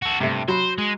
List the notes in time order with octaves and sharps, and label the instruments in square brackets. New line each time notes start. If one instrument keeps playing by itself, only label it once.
[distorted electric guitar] F#4 A4
[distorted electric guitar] G2 [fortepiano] C3 A3
[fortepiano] F#3 B5 [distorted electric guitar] C5
[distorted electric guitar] G#3